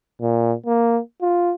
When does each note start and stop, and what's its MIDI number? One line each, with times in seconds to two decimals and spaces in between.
0.21 0.54 46
0.66 1.00 58
1.22 1.54 65